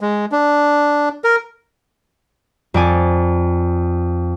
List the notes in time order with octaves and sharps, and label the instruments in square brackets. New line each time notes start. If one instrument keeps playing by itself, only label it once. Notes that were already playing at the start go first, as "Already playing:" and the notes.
[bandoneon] G#3
D4
A#4
[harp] F2 D5 G#5